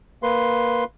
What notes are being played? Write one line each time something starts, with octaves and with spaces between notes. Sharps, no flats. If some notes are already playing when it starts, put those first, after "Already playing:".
A#3 B4 C6